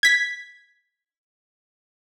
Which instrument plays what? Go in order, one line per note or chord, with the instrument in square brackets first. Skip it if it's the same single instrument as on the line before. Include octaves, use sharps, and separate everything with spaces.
[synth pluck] G#6 B6